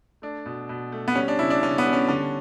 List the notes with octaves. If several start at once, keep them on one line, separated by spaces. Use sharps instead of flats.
A3 D4
B2
B2
A3
B3
G3 C#4
D4
C#3 E4
D4
C#3 C#4
B3
G3
C#4
D3 C#4